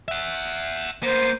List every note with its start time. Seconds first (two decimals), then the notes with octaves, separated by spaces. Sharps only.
0.08 E5 F#5
1.03 A#3 B3 C5